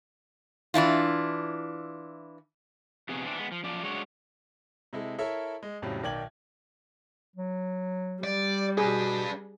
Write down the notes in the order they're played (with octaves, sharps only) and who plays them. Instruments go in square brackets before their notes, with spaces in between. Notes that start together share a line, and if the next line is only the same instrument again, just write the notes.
[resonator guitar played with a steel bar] E3 D4 E4 F4
[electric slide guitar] F2 C3 B3 G#4
E3 C4 D4
G#3 B3
F3
F#2 F3 D5
G#3 D4 F#4 C#5
[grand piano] C3 G#3 E4 A4
E4 A4 A#4 C#5 E5
G#3
F2 A2 C#3 F#3 G3
B1 D#3 D5 G5 G#6 F#7
[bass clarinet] F#3
[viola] G3 [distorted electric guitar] D5
[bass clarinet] B2 [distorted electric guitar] D4 B4 [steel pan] G#4